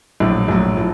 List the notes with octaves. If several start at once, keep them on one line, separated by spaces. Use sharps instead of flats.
A#1 A2 F#3
A#1 A2 F#3
A2 F3